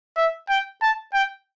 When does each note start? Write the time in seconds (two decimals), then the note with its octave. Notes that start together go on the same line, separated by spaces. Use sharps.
0.17 E5
0.50 G5
0.82 A5
1.14 G5